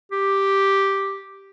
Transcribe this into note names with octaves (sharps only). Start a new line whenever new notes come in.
G4